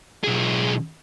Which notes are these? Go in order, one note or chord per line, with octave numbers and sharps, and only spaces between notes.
B1 G#4